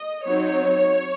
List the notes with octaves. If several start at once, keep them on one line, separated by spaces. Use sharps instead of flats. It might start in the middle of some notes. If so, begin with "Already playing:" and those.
Already playing: D#5
F#3 C4 D#4 C#5